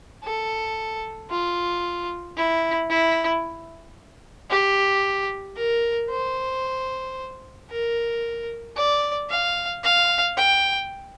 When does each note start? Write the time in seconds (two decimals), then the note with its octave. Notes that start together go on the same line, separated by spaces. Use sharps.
0.24 A4
1.31 F4
2.37 E4
2.90 E4
4.50 G4
5.57 A#4
6.10 C5
7.71 A#4
8.77 D5
9.30 F5
9.84 F5
10.38 G5